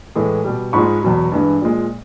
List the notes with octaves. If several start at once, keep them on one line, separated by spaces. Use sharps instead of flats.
A2 E3 G#3
B2 G3
G#2 F3 G#3 B5 C#6
E2 B2 F#3
G2 E3 G#3
A#2 F3 G#3